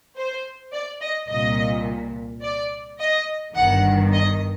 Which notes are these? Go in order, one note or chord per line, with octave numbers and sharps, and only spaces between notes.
C5
D5
D#5
C2 A#2 D#5
D5
D#5
G1 G2 D#3 F#5
D#5